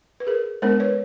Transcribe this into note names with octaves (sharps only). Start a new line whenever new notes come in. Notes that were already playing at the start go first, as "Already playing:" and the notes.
B4
G#4 A#4
G#3 B3 D4 A#4 C5
B4 C#5